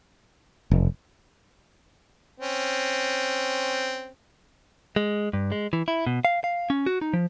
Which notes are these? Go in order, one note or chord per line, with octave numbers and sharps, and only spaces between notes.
F1
C4 C#4
G#3
G2
G#3
E3
E4
B2
F5
F5
C#4
F#4
D#4
F3